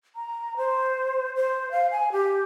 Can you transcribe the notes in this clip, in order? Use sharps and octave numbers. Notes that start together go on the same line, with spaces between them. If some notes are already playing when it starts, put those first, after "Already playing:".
A#5
C5
C5
F5
G#5
G4